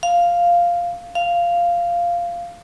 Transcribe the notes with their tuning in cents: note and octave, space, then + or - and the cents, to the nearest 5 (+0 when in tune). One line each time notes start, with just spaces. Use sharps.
F5 -5
F5 -10